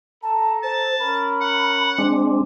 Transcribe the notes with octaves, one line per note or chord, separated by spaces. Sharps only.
A4 A5 A#5
C5 A5
C#4 A#4 B5
F#5
G#3 C4 D4